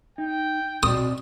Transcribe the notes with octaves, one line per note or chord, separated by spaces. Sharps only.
D#4 G5
B2 C4 D5 D#6